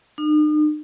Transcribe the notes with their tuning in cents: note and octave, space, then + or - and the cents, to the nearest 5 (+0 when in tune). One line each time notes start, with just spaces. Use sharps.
D#4 -45